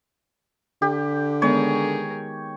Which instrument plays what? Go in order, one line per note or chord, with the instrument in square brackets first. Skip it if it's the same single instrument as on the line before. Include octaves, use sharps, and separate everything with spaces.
[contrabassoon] D3 [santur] G4
[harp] D#3 G#3 B3 [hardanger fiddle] G#4 A#4 [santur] C#5